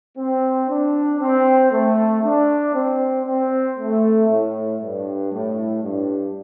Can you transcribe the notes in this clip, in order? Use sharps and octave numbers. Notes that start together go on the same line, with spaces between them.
C4
D4
C4
A3
D4
C4
C4
A3
A2
G2
A2
G2